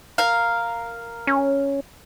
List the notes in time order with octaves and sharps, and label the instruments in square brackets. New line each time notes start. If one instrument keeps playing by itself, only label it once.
[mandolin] A#4 F5
[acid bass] C#4